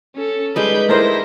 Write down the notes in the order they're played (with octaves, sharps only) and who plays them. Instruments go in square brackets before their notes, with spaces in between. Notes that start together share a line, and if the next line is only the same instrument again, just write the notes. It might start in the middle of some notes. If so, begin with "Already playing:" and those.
[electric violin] C#4 A4
[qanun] G3 G#3 D#4 [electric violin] B4 G6
[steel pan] A3 A#4 C5 [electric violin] E4 A#6